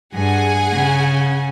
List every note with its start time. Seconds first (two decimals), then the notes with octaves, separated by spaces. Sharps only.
0.14 G2 G#4 F#5 G#5
0.73 C#3